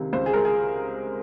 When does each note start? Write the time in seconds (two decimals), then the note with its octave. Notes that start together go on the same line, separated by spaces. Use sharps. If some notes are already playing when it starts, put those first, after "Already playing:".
Already playing: C#2 C3 D#3
0.13 C#2 C5
0.26 G#4
0.33 G#3 A#4
0.45 G#4